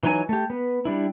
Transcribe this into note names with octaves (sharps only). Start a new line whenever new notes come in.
E3 F#3 D#4 C#5 G#5
A3 G4
B3
G3 D4 E4